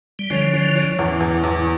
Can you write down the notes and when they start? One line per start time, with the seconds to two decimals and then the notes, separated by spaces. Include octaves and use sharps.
0.19 G3
0.30 D3 F3 C#4
0.53 C#4
0.76 C#4
0.99 E2
1.20 E2
1.43 E2